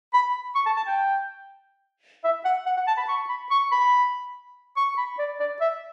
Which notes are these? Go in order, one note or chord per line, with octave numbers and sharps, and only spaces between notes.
B5
C#6
A5
A5
G5
E5
F#5
F#5
F#5
A5
B5
C#6
B5
C#6
B5
C#6
B5
D5
D5
E5